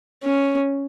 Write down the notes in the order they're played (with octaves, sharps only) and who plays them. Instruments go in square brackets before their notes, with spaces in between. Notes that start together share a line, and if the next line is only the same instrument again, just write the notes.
[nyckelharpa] C#4